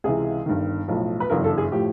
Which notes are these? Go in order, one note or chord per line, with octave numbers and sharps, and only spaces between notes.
C#2 C3 E3 G#4
G1 G2 D#3
B1 A2 F3
B4
G1 F#2 C#3 E3 A#4
A4
G#4
A2 F3 G4